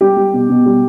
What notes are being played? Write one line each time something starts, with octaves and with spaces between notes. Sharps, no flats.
G3 G4
G3
B2
B2
G3